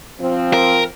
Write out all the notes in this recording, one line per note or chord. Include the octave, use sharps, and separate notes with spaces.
F3 C4
A#4